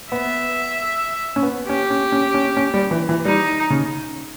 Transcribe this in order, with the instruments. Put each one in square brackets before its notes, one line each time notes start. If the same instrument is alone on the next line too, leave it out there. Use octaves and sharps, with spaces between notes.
[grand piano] B3 [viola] E5
[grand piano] C#4
B3
[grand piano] C#4 [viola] G4
[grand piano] C#4
C#4
C#4
C#4
G3
E3
E3
[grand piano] G3 [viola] D#4
[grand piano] C#3